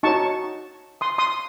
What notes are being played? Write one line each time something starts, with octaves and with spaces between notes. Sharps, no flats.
D#4 F#4 C#5 A5 C#6
C6 D#6
C6 D#6